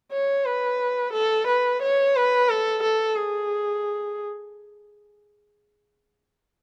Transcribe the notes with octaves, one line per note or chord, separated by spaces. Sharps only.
C#5
B4
A4
B4
C#5
B4
A4
A4
G#4